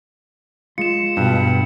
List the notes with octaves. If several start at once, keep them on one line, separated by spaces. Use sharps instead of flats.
G#3 F4 C#7 E7
G2 B2